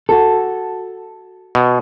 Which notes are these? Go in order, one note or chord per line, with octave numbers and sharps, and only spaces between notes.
F#4 A4
B2